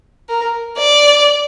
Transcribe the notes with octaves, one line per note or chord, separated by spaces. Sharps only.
A#4
D5